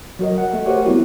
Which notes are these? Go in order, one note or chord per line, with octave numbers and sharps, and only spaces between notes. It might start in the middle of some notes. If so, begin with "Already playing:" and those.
F#3 F#4 A#4 D#5
F#5
A3
F#4 G4 A#4 C5 C#5 F#5
G3 B3 C4 E4 F#4